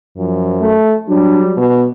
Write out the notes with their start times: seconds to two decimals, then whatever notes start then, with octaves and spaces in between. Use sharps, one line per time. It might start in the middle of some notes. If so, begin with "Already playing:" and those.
0.17 F#2 F3
0.61 A3
1.08 F#3 G3 D4
1.57 B2